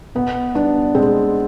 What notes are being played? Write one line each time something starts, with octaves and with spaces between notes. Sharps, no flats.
B2 B3
G3 B3 D4
B2 G#3 C4